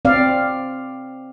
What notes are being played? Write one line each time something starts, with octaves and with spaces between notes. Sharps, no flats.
C4 D5 F5